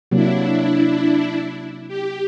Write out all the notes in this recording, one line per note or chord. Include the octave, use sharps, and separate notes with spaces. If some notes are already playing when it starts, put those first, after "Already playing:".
C3 F#3 A#3 D4 E4
G4